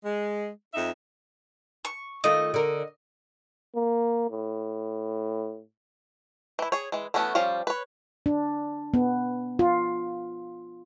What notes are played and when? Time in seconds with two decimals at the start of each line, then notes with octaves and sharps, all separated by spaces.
0.04 G#3
0.74 F2 D#4 E5
1.85 C#6
2.24 D#3 A3 F4 D#5
2.54 D3 A#4
3.75 A#3
4.31 A2
6.59 E3 E4
6.72 G#4 C#5
6.92 E3 G#3
7.14 E3 A3 B3 C#4 F#4
7.35 F3 G3 C#4 F5
7.67 B4 C#5
8.26 D4
8.94 B3
9.59 F4